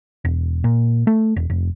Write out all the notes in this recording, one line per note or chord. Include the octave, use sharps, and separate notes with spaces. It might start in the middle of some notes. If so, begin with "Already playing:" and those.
E1
A#2
A3
E1
F1